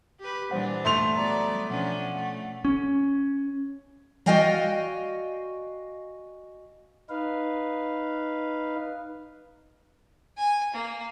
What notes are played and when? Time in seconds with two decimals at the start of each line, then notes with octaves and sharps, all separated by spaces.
0.20 G4 B4
0.51 A#2 E3 G3 D4 C5 F#5
0.85 A3 C6 F7
1.16 F#3 B3 D5 A#5
1.70 B2 F3 C#4 D4 F#5
2.15 A3
2.65 C#4
4.26 F#4 D5 D#5 F5 G5 G#5
7.10 D#4 B4 F5
10.38 G#5
10.74 A#3